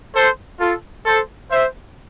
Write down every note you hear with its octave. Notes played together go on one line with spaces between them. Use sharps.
A4 C5
F4 A4
A4 C5
C5 E5